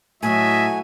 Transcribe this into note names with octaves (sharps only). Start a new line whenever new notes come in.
A2 F#3 A3 F#4 D#5 E5 G#5